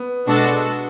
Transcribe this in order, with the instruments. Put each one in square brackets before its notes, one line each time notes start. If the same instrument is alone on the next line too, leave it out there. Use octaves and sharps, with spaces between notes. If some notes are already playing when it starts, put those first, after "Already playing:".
Already playing: [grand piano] B3
[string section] B2 G#3 D4 F#4 A4